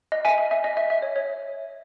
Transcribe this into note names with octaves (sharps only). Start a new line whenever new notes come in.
D#5
E5 G#5
E5
E5
D#5
E5
E5
C#5
C#5